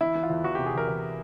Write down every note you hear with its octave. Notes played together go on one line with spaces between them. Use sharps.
E3 E4
E3
F4
E2
E2 F#4
C3 G4
G#4
E2 A#4
E2